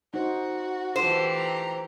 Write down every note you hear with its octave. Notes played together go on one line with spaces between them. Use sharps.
D#4 F#4 C5
E3 F4 G4 A4 C5
A#5